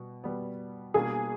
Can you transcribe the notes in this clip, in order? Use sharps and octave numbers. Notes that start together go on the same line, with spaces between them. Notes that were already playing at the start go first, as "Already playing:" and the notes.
Already playing: B2 G3 B3
B2 G3 B3
B2 G3 A#3 D4 G#4